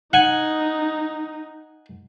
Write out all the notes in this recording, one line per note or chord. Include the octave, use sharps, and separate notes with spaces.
D#4 F#5 G#5